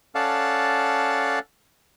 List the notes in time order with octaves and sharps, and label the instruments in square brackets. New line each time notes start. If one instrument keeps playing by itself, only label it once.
[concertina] C#4 A4 D5 F5 F#5 A5